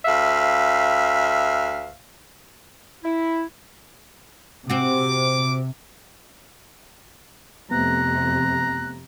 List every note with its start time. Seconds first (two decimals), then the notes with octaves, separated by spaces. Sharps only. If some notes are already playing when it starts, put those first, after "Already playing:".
0.05 D2 E5 F5
3.04 E4
4.70 C3 C4 F#4 D6
7.71 F2 C3 A3 B3 A#5 F#6